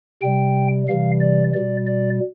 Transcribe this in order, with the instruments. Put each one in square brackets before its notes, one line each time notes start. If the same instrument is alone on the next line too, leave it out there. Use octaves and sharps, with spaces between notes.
[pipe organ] C3 G3 G5
C3 E3 G3 F5
D5
B2 G3 D5
D5